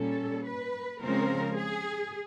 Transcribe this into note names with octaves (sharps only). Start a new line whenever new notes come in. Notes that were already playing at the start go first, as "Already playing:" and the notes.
Already playing: A#2 G3 A#3 C#4 A4
B4
C#3 F3 G#3 C4 A#4
G#4